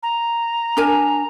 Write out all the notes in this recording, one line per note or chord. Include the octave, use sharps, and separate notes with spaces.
A#5
D4 A#4 G#5